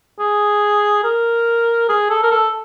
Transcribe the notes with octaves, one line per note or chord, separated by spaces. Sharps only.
G#4
A#4
G#4
A4
A#4
A4